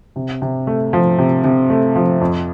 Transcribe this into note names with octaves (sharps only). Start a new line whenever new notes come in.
C3
C3
A3
F3
C3
C3
A3
F3
F2